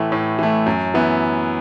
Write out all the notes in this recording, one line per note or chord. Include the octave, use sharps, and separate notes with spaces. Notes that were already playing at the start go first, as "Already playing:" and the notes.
Already playing: A2 E3 A3
A2
E3 A3
F#2
E3 B3 E4